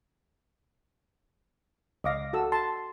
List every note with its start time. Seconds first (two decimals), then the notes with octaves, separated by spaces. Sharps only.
2.04 C#2 D#5 F5 D6 A#6
2.33 F#4 A4 E6
2.52 A5 C6